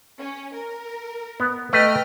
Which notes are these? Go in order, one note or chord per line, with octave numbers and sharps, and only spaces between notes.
C#4
A#4
B3
A3 B4 D#5 G5 F6